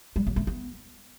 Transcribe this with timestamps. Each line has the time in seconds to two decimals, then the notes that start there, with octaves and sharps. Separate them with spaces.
0.16 G3
0.27 F#3
0.36 A3
0.47 B3